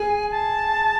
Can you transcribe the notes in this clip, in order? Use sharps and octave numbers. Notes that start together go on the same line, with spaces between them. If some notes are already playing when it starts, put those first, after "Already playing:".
Already playing: G#4 G#5
A5